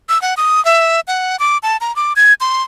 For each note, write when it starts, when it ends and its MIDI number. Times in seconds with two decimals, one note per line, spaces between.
0.09 0.21 88
0.22 0.34 78
0.37 0.63 87
0.65 1.00 76
1.08 1.39 78
1.39 1.58 86
1.63 1.77 81
1.81 1.94 82
1.96 2.13 86
2.16 2.33 92
2.41 2.63 84